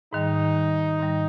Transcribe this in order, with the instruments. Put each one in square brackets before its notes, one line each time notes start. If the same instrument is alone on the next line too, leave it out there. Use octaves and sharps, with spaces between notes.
[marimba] G#2 D#3 G3 [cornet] D#4
[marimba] G#2 D#3 G3